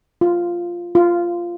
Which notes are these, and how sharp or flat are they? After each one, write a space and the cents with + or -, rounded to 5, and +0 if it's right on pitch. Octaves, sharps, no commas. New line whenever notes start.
F4 -5
F4 -10